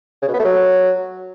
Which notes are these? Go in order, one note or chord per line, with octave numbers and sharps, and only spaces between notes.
C#3
B2
B3
A3
F#3